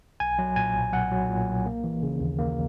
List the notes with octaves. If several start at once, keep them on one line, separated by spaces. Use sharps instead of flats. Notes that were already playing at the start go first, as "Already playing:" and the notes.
B1 G#5
F#3
A#2 G#5
B1
B1 F#5
F#3
A#2
B1
A#3
E3
C#3
D#2
A#3